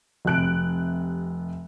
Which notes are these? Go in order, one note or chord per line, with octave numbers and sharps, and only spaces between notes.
F1 C3 F#6 D7